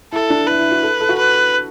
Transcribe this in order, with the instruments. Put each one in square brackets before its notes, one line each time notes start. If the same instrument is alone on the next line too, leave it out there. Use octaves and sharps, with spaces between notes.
[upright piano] E4 [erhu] A4
[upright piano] D4
[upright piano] E4 [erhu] B4
[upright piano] E4
F#4
A4
A4
F#4
[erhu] B4